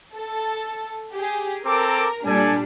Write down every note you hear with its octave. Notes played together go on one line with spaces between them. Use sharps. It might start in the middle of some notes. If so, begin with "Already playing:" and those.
A4
G4 G#4
C4 A4 A#4 D6
A#2 G3 D4 A4 D5 G#5